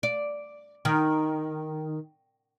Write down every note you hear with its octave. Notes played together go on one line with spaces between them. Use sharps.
D5
D#3